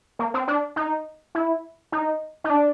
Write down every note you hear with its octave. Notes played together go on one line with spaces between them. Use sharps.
A#3
C4
D4
D#4
E4
D#4
D#4
D4